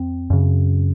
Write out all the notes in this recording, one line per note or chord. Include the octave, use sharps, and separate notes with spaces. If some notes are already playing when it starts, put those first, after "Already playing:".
Already playing: F2 C4
F#2 C#3